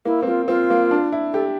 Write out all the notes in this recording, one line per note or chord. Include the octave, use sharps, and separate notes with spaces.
A#3 E4
C4
A#3 F4
C4 F4
A#3
D4
E4
G4 A4